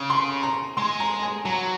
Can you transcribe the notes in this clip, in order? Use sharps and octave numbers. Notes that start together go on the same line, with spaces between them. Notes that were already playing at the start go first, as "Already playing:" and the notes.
Already playing: C#3
C6
A#5
G#3 C6
A#5
G#5
F#3 A#5